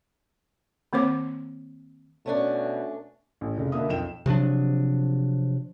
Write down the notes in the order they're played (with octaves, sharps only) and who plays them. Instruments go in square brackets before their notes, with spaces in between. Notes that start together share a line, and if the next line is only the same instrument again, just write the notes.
[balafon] D#3 A#3 C4 C5 C#5 D6
[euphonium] B2 [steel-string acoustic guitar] A3 C#4 D4
[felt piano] A1
F1 C#3
B2 D3 A#3 E5 D#6
B1 F2 G5 E7
[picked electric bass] C3 F3 F#3 D4